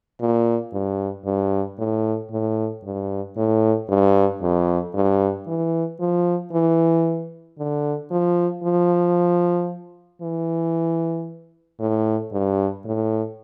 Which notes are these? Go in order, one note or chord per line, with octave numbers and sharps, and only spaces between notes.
A#2
G2
G2
A2
A2
G2
A2
G2
F2
G2
E3
F3
E3
D3
F3
F3
E3
A2
G2
A2